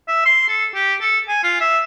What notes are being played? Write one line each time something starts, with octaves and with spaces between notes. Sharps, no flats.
E5
C6
A4
G4
A4
G#5
F4
E5